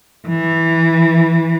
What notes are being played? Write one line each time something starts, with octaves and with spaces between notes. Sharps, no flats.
E3